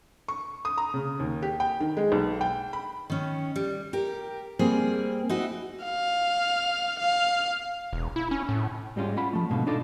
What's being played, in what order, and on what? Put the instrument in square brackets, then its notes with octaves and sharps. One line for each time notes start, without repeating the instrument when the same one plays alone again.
[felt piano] C#6
D#6
A#5
C#3
D#2
G4
G5
D#3
G#3
B1
G5
B5
[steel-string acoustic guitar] D#3 C#4
G3
G4 A#4
G3 A#3 C4 G#4
D#4 E4 F#4
[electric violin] F5
F5
[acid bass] E1
E4
C#4
A2
[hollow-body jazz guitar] G#2 G3 G#3 C#4 F4
C#4 F4 F#5 B5
F3 A3
G#2 B2 D3 F5
D4 D#4 F4 A4 D5